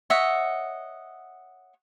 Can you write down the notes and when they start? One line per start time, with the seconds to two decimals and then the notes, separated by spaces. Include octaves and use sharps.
0.10 C#5 D#5 E5 F#5